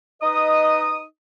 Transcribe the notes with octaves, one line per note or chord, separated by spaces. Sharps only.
D#4 B4 D#5 D#6